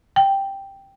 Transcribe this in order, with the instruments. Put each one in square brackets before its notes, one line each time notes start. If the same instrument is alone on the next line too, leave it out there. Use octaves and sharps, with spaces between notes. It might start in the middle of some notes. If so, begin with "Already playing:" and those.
[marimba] G5